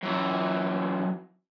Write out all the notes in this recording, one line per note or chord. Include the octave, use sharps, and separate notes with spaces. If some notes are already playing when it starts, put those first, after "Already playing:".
F#2 E3